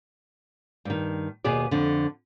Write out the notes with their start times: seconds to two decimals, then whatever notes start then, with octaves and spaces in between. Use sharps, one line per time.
0.85 G2 D#3
1.44 D#2 B2 B3 G#4 D5
1.71 F2 D3